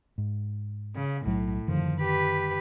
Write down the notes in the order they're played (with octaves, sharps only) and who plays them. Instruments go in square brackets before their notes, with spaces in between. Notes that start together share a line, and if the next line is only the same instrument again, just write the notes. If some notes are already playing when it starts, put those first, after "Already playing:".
[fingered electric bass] G#2
[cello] C#3
[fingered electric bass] B1 F#3 [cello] A2
[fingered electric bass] F#2 D3 D#3 [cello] F3
[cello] G4 B4